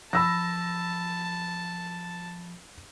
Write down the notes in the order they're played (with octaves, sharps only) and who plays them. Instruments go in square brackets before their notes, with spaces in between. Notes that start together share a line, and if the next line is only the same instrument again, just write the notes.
[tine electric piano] F3 [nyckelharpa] A5 [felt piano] B5 E6 A#6